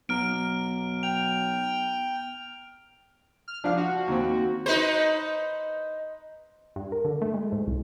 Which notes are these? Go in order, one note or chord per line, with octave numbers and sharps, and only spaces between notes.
B1 B3 A#5 F6 D7
G5 F7
F6
F3 D4 F5 F6
F#4
D#2 C4
D#4 B4 C5
G2
A#4
D3
A3
G#3
G#2
C2